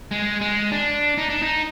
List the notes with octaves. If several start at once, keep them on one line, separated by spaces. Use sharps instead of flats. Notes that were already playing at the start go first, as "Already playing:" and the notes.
G#3
G#3
D4
D#4
D4
D#4